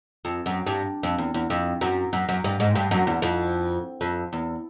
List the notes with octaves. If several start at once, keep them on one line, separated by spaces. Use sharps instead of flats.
F2
F#2
G2
F2
E2
E2
F2
F#2
F#2
F#2
G2
G#2
G2
F#2
E2
F2
F2
E2